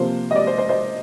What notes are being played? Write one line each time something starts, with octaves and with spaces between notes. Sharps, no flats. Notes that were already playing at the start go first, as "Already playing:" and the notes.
Already playing: C3 F3 A#3 C5
D#5
D5
C5
C5
C5 D#5